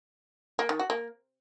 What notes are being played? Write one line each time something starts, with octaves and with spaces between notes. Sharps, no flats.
A#3
D#3
F#4
A#3